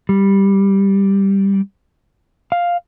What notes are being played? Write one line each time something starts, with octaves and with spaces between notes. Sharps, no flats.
G3
F5